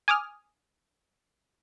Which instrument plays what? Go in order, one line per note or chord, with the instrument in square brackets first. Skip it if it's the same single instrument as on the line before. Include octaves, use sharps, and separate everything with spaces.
[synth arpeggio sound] G#5 D6 D#6 F6